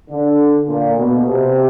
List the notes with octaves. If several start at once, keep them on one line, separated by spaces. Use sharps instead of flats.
D3
A#2
B2
C3